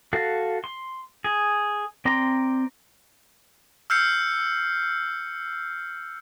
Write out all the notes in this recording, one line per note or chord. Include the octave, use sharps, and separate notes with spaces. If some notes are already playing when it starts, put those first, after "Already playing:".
F#4 A4 F5
C6
G#4
C4 D5 A#5 C6
E6 F6 G6 C7 C#7